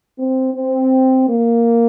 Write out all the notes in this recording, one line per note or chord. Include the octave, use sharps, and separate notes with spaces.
C4
C4
A#3